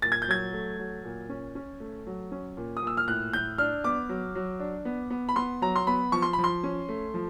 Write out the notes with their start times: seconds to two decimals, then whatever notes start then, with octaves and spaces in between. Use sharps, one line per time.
0.02 A#2 A6
0.12 G#6
0.22 G6
0.28 F#3 G#6
0.53 A3
0.79 F#3
1.04 A#2
1.29 C#4
1.55 C#4
1.80 A3
2.07 F#3
2.32 C#4
2.57 A#2
2.77 D#6
2.82 A#2 E6
2.97 F6
3.08 A2 F#6
3.33 A2 G6
3.58 D4 F6
3.84 B3 D6
4.09 F#3
4.35 F#3
4.60 D4
4.85 B3
5.10 B3
5.29 B5
5.36 B3 C6
5.62 F#3 A#5
5.76 C6
5.87 B3 B5
6.12 F3 C#6
6.22 C6
6.33 B5
6.38 F3
6.44 C6
6.64 C#4
6.89 A3
7.14 F3